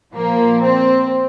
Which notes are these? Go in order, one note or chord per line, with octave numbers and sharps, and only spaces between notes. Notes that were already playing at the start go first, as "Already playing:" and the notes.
A#2 F3 A#3
C4